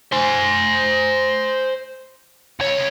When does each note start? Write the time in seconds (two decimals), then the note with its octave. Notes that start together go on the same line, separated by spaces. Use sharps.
0.12 C5 G#5
2.60 C#2 C#5